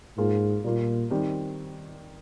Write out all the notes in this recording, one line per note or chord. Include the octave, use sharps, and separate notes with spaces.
G#2 A#3 F4 G#4
A#2 G3 A#3 F4
D#3 G3 C4 G4